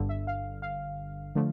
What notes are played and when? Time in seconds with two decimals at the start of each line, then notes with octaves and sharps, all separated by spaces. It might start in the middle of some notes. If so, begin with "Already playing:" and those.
Already playing: G1 G2 D3
0.09 E5
0.27 F5
0.62 F5
1.35 D3 F3 A3